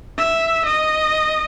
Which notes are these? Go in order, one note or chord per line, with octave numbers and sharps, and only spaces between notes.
E5
D#5